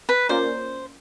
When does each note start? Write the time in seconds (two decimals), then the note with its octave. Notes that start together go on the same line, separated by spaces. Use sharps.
0.09 B4
0.29 A#3 C#4 F4 A#4 C5 D5